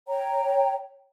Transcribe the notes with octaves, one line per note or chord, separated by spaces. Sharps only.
C#5 G5 A#5